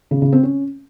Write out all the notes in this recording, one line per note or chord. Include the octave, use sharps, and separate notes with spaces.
C#3
C#3
C4
C#4